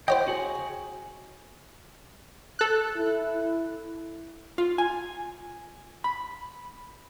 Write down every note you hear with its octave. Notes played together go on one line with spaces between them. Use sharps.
E4 C5 C#5 D#5 F#5 G5
F#4 G#4
A4 F#6
E4
F4
G#5
B5